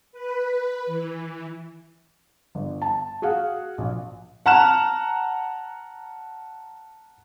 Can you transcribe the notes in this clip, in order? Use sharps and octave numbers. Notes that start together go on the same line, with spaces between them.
B4
E3
G1
A5
F#4 G#4 F5 F#5
A#1
F#5 A5 A#5 F6 F#6 E7